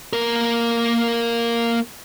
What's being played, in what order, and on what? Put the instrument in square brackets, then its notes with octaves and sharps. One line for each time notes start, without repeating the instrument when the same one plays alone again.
[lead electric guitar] A#3 A#4